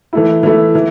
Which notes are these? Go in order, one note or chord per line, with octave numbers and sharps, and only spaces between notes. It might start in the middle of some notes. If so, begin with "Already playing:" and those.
E3 A3 E4
E3 A3 E4
E3